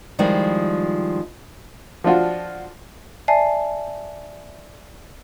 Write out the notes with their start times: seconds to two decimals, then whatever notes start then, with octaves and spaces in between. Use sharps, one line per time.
0.19 D#3 F3 G3 G#3 E4
2.04 F3 D4 F4 F#4
3.28 D5 E5 G#5 A5 C7